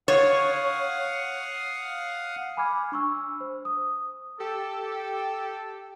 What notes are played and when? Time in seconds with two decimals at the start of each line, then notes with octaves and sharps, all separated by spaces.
0.08 C#5 F5 F#5 D#6
2.57 G#5 B5 D6 F6 G#6
2.92 D4 C#6 E6
3.41 C5
3.65 D#6
4.40 G4 A4